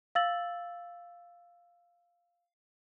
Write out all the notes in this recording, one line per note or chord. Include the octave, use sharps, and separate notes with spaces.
F5 E6 A6 F#7